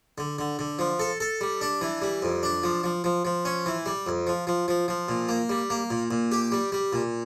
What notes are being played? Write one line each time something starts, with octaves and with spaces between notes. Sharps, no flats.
D3
D3
D3
F3
A4
A4
G3
D4
E3
G3
F2
D4
F3
F3
F3
F3
C#4
E3
G3
F2
F3
F3
F3
F3
A#2
A#3
G3
A#3
A#2
A#2
G4
G3
G3
A#2